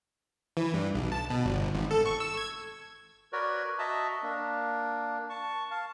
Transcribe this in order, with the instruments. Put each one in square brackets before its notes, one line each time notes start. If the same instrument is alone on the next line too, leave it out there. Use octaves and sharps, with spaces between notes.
[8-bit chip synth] E3
G2
B1
A5
B2
G1
G#1
A4
C#6
E6
G#6
[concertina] F#4 A#4 B4 C#5 D5
F#4 D#5 E5 A5 A#5
A#3 D4
A5 C#6
F5 A5